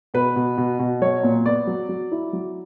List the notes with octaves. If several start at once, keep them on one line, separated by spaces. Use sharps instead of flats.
B2 B4
B2
B2
B2
F#3 C#5
A#2
B3 D5
F#3
F#3
E4
F#3